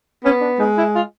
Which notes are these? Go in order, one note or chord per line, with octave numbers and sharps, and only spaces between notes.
B3 C#4
D4
G#3 D#4
E4
F4